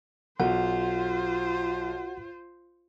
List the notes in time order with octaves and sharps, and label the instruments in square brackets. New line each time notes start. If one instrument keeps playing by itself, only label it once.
[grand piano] B1 [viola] F4 C5 [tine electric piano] F#4 F#5